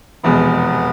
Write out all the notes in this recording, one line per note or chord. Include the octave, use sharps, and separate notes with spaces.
F1 E2 B2 G#3 B3